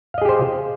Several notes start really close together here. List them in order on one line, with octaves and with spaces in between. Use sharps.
F5 D#5 G#4 G4 C5